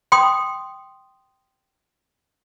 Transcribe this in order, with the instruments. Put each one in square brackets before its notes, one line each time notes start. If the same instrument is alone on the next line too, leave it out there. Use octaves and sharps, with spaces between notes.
[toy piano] G5 C6 D#6